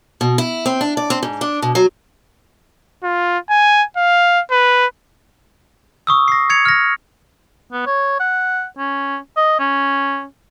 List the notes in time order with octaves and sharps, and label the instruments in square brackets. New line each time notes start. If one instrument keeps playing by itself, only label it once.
[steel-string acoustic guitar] B2
E4
C4
D4
D5
C4
G#2
D4
B2
F#3
[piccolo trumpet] F4
G#5
F5
B4
[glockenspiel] C#6 D#6 E6
A#6 C7
G#6 C#7 F7
F6 A#6
[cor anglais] B3
C#5
F#5
C#4
D#5
C#4